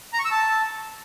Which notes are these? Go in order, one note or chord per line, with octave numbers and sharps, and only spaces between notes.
A#5
C#6
E6
A5